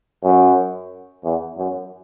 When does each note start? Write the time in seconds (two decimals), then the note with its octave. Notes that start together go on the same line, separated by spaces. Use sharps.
0.24 F#2
1.25 E2
1.58 F#2